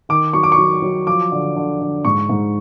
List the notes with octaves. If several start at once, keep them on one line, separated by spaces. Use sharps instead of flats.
D#3 D6
F#3 C#6
D6
C#6
F#3
F#3
F3 D6
D3
D3
D3
G#2 C#6
G#2